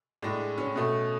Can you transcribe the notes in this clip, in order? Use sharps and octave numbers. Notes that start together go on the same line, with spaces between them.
A2 G#3 D4
C#4
B2 A3